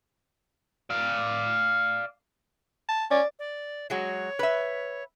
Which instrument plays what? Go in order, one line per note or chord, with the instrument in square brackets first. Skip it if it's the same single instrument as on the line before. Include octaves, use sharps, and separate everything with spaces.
[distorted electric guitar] D5 F5
[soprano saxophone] A5
[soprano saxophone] C#4 [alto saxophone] D5
[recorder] D5
[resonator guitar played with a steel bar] F#3 G#3 F#4 [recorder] C#5
[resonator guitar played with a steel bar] B4 E5